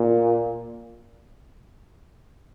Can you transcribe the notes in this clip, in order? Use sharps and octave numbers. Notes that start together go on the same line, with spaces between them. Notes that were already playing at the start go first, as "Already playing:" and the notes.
Already playing: A#2